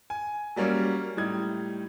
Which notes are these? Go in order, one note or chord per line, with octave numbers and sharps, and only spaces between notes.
G#5
F#3 G3 A#3 C#4
A2 G3 D#4 G#6